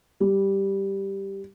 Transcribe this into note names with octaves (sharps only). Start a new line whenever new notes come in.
G3